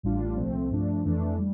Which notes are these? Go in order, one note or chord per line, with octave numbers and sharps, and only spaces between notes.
A1 A2 G3 D4 F4
C2 A#2 F3 A3 C4
G2 F3 A3 D4
F2 E3 A3 D4
G3